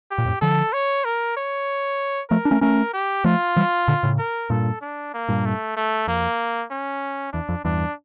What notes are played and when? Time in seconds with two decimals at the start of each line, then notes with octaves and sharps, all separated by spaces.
0.11 G4
0.18 A#2
0.26 F2 A2
0.41 D3 F3 A4
0.73 C#5
1.05 A#4
1.37 C#5
2.30 F3 A3 A#4
2.45 D4
2.51 A3 C#4
2.61 A3 C#4 A#4
2.94 G4
3.24 F3 A3 F4
3.56 E3 G3
3.88 A#2 D3
4.03 A2 C#3
4.19 A#4
4.50 G2 A#2 A4
4.81 D4
5.14 A#3
5.28 G2 A#2
5.45 A3
5.77 A3
6.07 F2 A#3
6.71 C#4
7.33 E2 D4
7.49 F2
7.64 E2 G2 D4